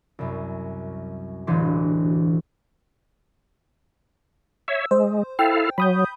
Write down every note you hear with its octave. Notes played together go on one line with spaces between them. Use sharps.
C2 F#2
E1 A1 D2 E3 G4 C6
C#5 E5 E6
G#3 C5
E4 A4 F5 G5
F#3 B5 D#6 G6